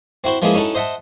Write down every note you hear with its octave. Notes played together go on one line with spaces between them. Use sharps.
C4 E4 F#4 C5
F3 G#3 A#3 B3 E4 G#4
C#4 D#4 E4 F#4 A4
C5 D#5 E5 F#5 A5